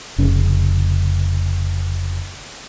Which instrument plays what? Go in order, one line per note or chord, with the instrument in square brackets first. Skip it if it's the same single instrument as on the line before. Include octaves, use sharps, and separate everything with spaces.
[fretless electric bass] F1 C#3